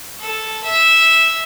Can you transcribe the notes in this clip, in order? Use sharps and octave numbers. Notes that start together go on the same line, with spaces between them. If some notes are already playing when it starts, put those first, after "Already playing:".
A4
E5